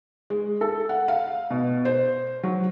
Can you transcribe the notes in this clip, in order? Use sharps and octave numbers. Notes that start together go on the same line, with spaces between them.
G#3
A4
F#5
F5
B2
C5
F#3